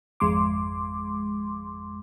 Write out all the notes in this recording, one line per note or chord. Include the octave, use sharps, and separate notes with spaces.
G#1 F2 G#3 C6 D6